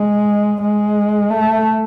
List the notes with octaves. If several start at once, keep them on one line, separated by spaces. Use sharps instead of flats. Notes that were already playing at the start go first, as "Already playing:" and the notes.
Already playing: G#3
G#3
A3